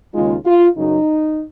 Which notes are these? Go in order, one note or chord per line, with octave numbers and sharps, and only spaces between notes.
D#2 C#3 G#3 D#4 F4
F4
F#2 C#3 F#3 D#4